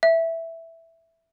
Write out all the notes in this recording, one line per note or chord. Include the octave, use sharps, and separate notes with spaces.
E5